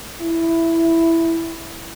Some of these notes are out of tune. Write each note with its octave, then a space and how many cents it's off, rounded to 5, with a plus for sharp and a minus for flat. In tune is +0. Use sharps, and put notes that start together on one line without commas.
E4 +5